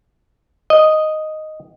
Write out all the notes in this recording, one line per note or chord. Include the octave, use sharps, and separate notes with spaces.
D#5